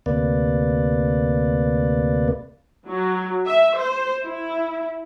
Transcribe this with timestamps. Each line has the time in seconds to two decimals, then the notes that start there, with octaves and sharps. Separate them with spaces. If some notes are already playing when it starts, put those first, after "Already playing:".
0.06 D2 C3 A#3 B4 D5
2.87 F#3
3.44 E5
3.75 C5
4.23 E4